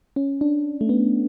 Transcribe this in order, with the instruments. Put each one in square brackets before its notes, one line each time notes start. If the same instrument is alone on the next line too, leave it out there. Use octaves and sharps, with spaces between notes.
[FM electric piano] C#4
D4
A3
B3